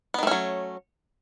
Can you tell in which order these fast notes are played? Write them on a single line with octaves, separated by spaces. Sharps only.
B3 D#3 A3 C#4 F#3